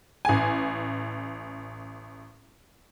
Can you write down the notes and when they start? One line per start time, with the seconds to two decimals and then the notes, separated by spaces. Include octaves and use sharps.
0.25 A1 G#5